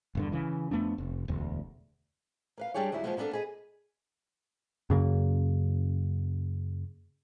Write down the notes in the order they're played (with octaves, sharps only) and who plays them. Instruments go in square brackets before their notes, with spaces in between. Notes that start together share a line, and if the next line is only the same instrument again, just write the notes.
[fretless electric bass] E1 G2 D3
C#3 E3
F2 A3 B3 D4
F1
E1 D2
[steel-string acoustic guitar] A#3 B4 F5
G3 D4 G4 G#4 C#5
D#2 F#3 G3 E4
D#3 F3 F#3 G#3 A#3 B3
D3 A#3 B3 D4 A4
G#4 B4 D#5
[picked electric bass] F#2 C#3 A#3